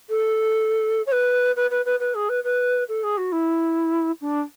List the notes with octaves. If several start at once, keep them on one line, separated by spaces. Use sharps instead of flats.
A4
C#5
B4
B4
B4
B4
B4
G#4
B4
B4
A4
G#4
F#4
E4
D4